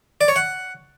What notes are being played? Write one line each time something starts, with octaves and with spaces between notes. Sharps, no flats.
D5
C#5
F#5